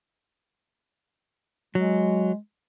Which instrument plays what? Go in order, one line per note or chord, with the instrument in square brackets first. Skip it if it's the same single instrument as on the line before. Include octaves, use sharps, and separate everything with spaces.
[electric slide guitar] F#3 [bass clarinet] G#3